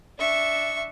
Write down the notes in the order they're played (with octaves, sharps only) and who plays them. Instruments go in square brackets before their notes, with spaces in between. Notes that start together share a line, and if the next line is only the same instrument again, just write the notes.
[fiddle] D4 C#6 [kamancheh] E5